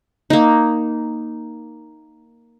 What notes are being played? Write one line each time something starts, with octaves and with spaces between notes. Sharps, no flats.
A#3 D#4